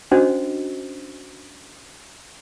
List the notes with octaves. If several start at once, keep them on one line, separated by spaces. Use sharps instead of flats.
C#4 D4 F#4 C5 D#5